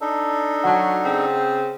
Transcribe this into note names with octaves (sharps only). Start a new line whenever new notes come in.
D4 D#4 A4
F#3 F#5 A5
C#3 C4